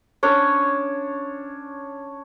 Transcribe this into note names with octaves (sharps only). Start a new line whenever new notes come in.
C#4 D4 C#5